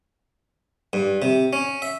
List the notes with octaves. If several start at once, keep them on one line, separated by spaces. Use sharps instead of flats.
G2
C3
C#4
E5